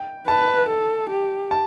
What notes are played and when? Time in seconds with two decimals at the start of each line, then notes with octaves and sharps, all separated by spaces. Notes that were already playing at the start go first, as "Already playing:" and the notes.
Already playing: G5
0.28 B4 A5
0.69 A4
1.10 G4
1.51 A5